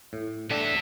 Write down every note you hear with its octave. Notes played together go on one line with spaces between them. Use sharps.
A2
A3 B3 D4 E5 G5